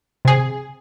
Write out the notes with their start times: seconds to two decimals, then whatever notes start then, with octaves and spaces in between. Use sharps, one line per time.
0.25 C3 G#4